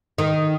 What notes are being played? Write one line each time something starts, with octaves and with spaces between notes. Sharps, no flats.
D#3